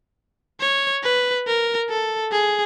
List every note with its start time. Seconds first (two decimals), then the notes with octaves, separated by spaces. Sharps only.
0.60 C#5
1.04 B4
1.47 A#4
1.90 A4
2.32 G#4